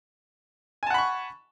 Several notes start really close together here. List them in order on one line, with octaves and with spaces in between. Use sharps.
G#5 A5 F#5 B5 C#6